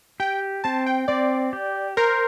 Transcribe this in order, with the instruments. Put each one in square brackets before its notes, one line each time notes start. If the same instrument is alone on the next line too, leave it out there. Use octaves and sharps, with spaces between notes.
[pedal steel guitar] G4 [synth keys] G5
[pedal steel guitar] C4 [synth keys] A5
[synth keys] G5
[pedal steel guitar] C4 [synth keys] D5
[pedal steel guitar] G4
[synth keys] A#4 [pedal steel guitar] C5